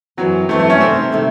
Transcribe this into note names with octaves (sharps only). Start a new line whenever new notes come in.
F#2 E3 F#3 C4
F#2 E3 A3 C4
A3
C#4
C3 D#3 A3 C4
C3 D#3 A3